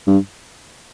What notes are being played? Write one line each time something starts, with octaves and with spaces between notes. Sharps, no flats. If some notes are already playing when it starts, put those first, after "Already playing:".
G2